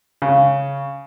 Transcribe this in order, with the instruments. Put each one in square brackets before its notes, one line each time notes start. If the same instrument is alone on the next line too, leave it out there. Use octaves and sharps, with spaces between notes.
[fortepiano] C#3